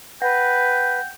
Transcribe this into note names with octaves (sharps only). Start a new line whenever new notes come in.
B4 F#5 G5 A#6